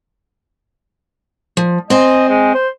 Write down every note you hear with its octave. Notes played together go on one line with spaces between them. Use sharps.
F3
C4 C5 D#5 G#5
G#3
C5